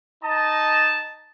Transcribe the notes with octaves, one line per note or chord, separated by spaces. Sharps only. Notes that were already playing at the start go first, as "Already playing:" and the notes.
D#4 D#5 A5